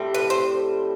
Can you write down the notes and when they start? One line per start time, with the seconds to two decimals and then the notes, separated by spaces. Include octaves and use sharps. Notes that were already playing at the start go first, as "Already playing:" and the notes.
Already playing: A2 G3 C4
0.14 B4
0.30 C5